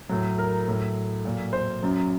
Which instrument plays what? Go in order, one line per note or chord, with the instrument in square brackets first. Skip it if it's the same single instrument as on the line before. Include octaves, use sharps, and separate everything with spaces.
[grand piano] A2 F#3
A#4
A2 F#3
A#2 F#3
C5
F#2 F#3